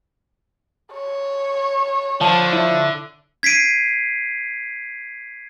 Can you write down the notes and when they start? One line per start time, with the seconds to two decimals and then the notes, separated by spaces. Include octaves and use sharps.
0.93 C#5
2.21 D3 F3 A5
2.53 E4
3.43 G#6 B6 C7 D7 D#7